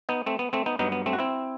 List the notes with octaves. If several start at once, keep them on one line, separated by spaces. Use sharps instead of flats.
B3 D#4
A3 C4
B3
A3 C4
B3 D#4
G2 F#3 B3 D#4
B3
A3 C4
F#4
C4 E4